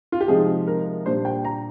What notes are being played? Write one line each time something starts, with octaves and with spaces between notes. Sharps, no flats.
F4
G4
C3 F3 G#3 D#4 G#4
A#4
A#2 G3 D4 C5
G5
A#5